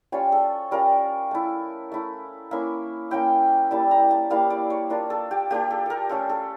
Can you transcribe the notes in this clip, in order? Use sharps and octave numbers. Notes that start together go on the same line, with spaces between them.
G3 C#4 F4 C#5
A4
G3 C#4 F4 A#4
A3 E4
A3 E4
A#3 C#4 E4 E5
A#3 C#4 E4 G5
G3 A#3 E4 A5
A#5
A5
G3 A#3 E4 F5
D5
C#5
A#3 D4 F4
A4
G4
A#3 D4 F4 G4
A4
A4 A#4
A3 C#4 F4 A4
A4